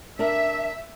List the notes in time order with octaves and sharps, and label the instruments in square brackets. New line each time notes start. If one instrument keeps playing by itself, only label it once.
[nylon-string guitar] D4 A#4 [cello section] E5